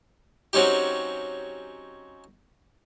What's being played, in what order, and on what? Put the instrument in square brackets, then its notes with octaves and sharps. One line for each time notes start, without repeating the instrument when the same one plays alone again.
[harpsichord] F#3 C4 C#4 D#4 G4